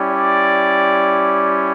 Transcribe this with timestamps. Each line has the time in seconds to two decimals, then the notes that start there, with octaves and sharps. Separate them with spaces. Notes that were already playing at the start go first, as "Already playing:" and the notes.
Already playing: G3 C#4 E4 G4
0.10 D5